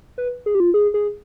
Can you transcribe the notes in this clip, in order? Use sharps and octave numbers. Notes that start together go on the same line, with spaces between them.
B4
G#4
G4
F4
G#4
G#4